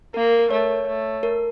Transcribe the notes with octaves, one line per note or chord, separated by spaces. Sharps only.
A#3 A#4
A#4
A3 C#5
A3
A#4